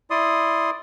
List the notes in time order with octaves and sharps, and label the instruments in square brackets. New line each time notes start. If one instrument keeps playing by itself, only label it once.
[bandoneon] E4 D5 C6 D#6